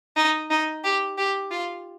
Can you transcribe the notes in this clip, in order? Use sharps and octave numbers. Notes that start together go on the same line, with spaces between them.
D#4
D#4
G4
G4
F4